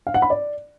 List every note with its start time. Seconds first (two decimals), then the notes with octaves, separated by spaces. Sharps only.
0.07 F5
0.14 F#5
0.22 B5
0.30 D5